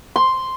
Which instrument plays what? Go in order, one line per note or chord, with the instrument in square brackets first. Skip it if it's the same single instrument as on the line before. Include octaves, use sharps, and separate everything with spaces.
[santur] C6